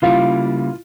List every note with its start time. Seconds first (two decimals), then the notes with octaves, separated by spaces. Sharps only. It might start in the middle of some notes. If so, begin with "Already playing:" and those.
0.02 C#3 G3 A#3 E4 F4 F5